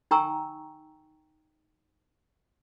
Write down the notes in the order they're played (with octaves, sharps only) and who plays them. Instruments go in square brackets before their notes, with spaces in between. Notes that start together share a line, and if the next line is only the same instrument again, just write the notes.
[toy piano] D#4 G5 G#5 A#5 C#6 E6